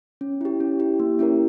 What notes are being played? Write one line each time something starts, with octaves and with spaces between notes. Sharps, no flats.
C#4
E4 G4
C#4
E4 G4
A#3
C#4 E4 G4 A#4